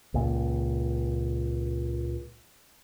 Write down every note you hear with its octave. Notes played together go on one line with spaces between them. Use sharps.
C#2 A#2